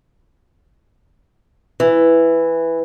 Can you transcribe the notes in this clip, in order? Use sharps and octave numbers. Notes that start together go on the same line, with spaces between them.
E3